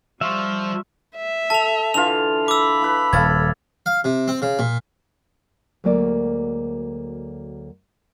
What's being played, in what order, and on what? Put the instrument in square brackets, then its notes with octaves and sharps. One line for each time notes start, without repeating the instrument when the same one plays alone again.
[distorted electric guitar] F3 [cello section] G3 [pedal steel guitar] E5 [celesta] C6 C#6 F6
[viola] E5
[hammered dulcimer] A4 [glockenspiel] A5 F7
[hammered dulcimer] D3 E3 F4 [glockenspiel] F7
[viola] B5 [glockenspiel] D6 E6
[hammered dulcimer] E4 B4
[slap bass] D#1 [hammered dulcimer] A4 F5 C#6 [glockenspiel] G#6 A6
[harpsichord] F5
C3
C4
C#3
A#2
[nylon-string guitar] D2 F#3 G#3 A#3 D5